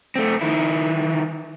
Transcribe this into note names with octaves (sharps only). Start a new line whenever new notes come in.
A3 C4
D#3 E4